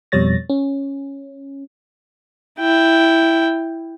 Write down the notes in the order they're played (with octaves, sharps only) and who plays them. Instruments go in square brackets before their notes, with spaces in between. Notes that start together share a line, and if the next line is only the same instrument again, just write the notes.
[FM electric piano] F2 B2 G3 C#5 A6 A#6
C#4
[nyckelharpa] E4 G5